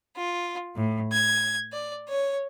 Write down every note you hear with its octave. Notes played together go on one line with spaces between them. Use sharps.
F4
A2
G#6
D5
C#5